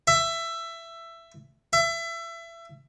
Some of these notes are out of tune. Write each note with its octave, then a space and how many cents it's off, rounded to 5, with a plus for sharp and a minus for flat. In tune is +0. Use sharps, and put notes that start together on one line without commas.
E5 +15
E5 +25